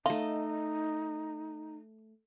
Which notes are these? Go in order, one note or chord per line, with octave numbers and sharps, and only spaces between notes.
A3 D#4 F4 D#5